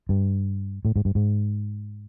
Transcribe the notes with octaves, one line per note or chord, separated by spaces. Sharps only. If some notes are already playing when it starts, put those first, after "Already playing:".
G2
A2
G#2
G2
G#2